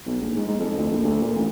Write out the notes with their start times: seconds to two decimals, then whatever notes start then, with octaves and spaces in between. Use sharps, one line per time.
0.06 B1
0.21 A#1
0.36 G#2
0.47 G#2
0.59 F2
0.77 D2
0.91 A#1
1.04 D2
1.21 A#2
1.35 A1